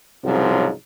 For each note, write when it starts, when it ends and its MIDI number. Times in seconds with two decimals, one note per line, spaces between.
0.25 0.70 36
0.25 0.70 44
0.25 0.70 49
0.25 0.70 53
0.25 0.70 54